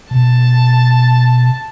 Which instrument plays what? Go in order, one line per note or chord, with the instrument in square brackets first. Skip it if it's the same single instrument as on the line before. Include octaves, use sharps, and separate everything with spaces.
[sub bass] B2 [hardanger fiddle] A5